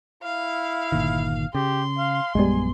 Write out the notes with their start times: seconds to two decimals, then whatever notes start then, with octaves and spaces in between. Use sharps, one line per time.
0.23 E4 F5
0.92 G1 A#2 D#3
1.55 C#3 G4 C6
1.98 F5
2.35 A#1 F#2 G3 G#3 B3 G#5